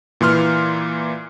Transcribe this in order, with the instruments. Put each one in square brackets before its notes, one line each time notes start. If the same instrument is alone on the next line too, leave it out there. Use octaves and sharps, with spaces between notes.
[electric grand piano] A#2 E3 C6 F6